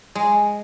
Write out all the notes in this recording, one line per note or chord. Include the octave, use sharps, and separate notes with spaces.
G#3